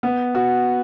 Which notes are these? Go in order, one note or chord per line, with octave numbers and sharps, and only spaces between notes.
B3
F#4